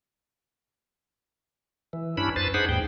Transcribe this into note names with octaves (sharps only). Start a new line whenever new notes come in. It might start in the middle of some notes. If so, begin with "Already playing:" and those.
E3
G2 C#4 D4 E4 B5
F#2 B4 C5 A6
D4 D#4 G#4 C5 F#5 B5
D#2 G#2 G5